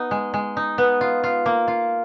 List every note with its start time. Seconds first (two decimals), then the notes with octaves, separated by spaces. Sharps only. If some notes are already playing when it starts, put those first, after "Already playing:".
Already playing: B3 D#4
0.11 G#3
0.34 G#3
0.57 D#4
0.78 B3
1.01 F4
1.24 F4
1.46 A#3
1.68 F4